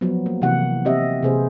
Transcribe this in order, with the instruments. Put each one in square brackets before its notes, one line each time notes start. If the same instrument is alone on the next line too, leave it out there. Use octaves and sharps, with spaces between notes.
[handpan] F3 F#3 B3
A#3
C3 E3 A#3 F#5
C4 G4 D#5 E5
C3 A#3 G#4 B4 C5